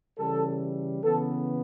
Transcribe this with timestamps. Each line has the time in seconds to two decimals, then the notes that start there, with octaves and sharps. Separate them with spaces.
0.17 C#3 E3 G3 A4
1.02 C#3 E3 B3 A4